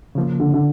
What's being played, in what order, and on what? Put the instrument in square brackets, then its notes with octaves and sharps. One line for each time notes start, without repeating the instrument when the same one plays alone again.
[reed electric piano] C#3 F3 A#3
[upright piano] D3
D3